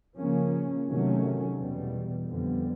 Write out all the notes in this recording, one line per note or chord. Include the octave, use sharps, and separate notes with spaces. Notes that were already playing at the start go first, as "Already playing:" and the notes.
C#3 F3 A#3 C#4
C3 D#3 F#3 A3 C#4
E2 B2 G3
F2 D3 G3 B3